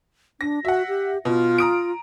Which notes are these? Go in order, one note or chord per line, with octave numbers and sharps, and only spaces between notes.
D4 A#6
F#4 E5 F#5
G4
B2 F4
A#5 D#6 D7